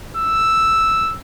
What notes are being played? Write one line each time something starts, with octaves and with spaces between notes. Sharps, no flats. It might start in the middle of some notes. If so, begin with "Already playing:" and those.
E6